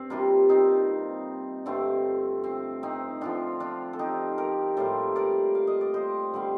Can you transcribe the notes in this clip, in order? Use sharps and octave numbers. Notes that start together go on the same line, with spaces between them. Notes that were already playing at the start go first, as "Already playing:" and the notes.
Already playing: G2 C4
C3 G3 A#3 D4 F4
C4 D#4
G2 D3 A3 C4
C4
C4 D#4
D3 F3 C4 D4 F4
D4 F4
A4
D#4 G4
G4 A#4
A2 G3 A#3 A4 C5
A#4 D5
F5
D#5
D5
C5 D#5
D3 G3 C4